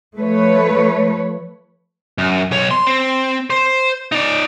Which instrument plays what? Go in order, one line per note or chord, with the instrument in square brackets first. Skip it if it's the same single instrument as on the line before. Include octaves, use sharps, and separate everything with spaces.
[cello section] F3 A3 B4 C#5
[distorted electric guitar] F#2
B1 C#5
C6
C4
C5
D#4 D5